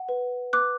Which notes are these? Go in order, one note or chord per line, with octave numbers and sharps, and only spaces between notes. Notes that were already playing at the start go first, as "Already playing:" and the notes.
Already playing: F#5
B4
B4 D6 F#6